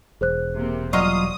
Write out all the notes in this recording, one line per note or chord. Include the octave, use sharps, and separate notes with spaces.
E1 G#4 C5 F#6
C3 A#3 C4
F#3 F4 D5 D#5 C#6 D#6 C7